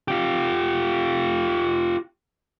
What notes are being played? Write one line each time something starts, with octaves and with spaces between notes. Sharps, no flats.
F4 G4